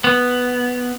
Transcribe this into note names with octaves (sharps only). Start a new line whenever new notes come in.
B3